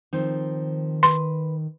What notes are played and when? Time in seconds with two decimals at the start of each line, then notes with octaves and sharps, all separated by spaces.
0.13 D#3 F3 C4 D#4
1.03 B4 C6